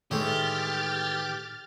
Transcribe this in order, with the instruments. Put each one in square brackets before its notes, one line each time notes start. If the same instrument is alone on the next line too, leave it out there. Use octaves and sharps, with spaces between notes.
[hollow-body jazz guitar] A2 D#3 [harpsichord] E3 G#3 A3 [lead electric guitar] G4 [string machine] F6 A6